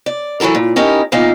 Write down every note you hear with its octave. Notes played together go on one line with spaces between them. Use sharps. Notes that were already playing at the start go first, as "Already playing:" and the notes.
D5
E3 F#3 E4 A4 A#4
A#2
C#4 D#4 E4 G4 A#4
E2 A#2 D#4 E4 F5